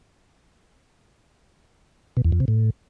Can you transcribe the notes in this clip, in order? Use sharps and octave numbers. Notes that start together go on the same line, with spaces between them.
B2
E2
F2
C3
A2